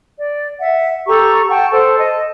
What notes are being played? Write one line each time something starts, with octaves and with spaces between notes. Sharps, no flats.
D5
E5 F#5
G4 A4 A#5 C#6
F#5 G5 A5 C#6
A4 C5 A5
D#5 A5